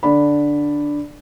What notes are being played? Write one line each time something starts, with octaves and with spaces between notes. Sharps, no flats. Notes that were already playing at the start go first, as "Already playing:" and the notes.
D3 D4 D5 B5